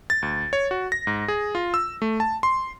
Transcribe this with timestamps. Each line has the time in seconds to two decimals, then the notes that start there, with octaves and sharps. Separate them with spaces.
0.10 A6
0.22 D2
0.53 C#5
0.71 F#4
0.92 A#6
1.07 G#2
1.28 G#4
1.55 F4
1.74 E6
2.02 A3
2.20 A5
2.43 C6